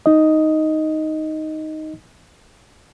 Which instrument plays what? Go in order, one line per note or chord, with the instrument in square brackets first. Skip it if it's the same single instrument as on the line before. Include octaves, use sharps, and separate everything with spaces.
[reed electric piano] D#4 D#5